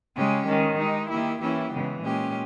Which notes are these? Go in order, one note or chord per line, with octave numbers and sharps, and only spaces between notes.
C#3 G#3 C#4 G4
D#3 G#3 C#4
G#3 D#4 G4
D#3 A#3 E4 G4
E3 A#3 C#4 E4 G4
C#3 E3 G#3 B3
A#2 G#3 C#4 G4